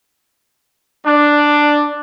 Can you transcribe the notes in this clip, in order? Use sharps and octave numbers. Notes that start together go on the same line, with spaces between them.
D4